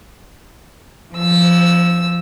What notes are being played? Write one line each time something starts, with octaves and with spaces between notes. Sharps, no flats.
F3 E6